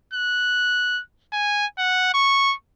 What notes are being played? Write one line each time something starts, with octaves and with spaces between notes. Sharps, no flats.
F#6
G#5
F#5
C#6